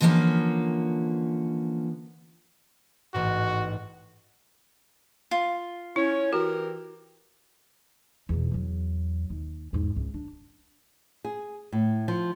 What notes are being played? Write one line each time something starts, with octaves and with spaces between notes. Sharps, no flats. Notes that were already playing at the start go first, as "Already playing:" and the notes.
D3 E3 F3 G3 A#3 C#4
A1 G#2 F#4
F4
C#4 E4 C#5
E3 F#4 G4 A#4
E2 B2
E2 F#3
D#2
E2 G#2
C#2
D4
G#4
A2
F3